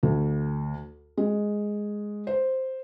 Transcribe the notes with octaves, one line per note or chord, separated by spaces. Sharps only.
D2
G#3
C5